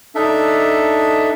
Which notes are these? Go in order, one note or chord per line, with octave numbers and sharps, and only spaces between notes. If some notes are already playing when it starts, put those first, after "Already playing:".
D4 D#4 A4 E5